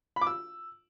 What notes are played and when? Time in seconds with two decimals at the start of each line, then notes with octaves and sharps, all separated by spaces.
0.16 B5
0.21 D6
0.27 E6